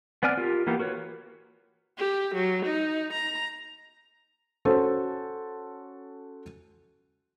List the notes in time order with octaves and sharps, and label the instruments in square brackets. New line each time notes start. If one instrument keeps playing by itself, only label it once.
[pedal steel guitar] B3 C4 D5 G#5 F6
F4 G4 A#4
E3 A#3 B3 G4 A#4
F#4 A#4 B4 C#5
[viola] G4
F#3
D#4
A#5
[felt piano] C#4 F#4 A4 C5